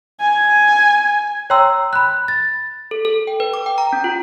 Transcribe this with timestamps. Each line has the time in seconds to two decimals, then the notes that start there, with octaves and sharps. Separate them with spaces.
0.21 G#5
1.50 C#5 G5 A#5 C6 E6
1.93 B5 F#6
2.28 A6
2.91 A4
3.05 A4
3.27 G5
3.40 B4
3.54 D6
3.66 G5
3.78 A#5
3.93 C#4
4.04 F4